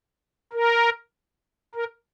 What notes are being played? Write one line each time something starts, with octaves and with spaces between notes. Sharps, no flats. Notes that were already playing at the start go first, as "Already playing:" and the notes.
A#4
A#4